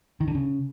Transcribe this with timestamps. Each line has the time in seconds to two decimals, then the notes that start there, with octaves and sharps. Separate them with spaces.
0.20 D#3
0.28 D3
0.35 C#3